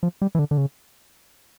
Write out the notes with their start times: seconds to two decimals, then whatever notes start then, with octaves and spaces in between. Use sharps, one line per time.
0.03 F3
0.22 G3
0.35 E3
0.39 D3
0.51 D3
0.58 C#3